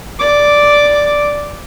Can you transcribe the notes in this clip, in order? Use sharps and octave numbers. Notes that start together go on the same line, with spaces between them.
D5 D6